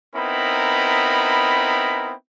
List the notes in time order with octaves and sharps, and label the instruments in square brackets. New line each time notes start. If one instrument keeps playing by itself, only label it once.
[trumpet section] B3 C4 D#4 E4 A#4 B5